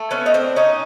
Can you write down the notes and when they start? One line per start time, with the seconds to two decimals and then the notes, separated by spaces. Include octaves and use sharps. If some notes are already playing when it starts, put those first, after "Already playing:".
Already playing: A3
0.11 B3 C#4
0.26 D#4
0.34 C4 D4
0.56 C#4 D#4